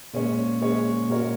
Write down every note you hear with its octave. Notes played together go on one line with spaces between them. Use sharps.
A#2 G#3 C#4 G#4 C#5
A#2 G#3 C#4 G#4 C#5
A#2 G#3 F#4 A#4 C#5